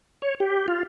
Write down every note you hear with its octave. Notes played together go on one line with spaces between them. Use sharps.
C#5
G4
F4